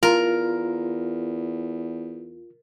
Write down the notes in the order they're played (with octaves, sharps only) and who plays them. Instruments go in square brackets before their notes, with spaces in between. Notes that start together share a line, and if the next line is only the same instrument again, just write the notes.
[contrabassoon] E2 [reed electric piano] F4 [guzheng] A#4